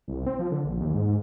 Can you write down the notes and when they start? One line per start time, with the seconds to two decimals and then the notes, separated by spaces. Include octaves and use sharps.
0.08 C2
0.26 C4
0.39 F3
0.52 D3
0.64 A#1
0.81 D#2
0.94 G#2
1.08 G#2